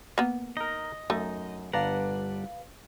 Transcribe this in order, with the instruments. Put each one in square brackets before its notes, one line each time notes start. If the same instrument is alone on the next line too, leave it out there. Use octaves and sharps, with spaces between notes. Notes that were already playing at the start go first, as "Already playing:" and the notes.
[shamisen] A#3 B3
[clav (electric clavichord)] D#4 A#4 [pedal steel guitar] D#5
[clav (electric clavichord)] F#2 D#4 [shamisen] A3
[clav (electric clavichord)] G1 D4 A#5 [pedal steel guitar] G3 F#5 [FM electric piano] B4 F5